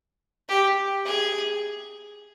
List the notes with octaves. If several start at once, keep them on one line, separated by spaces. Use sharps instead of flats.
G4
G#4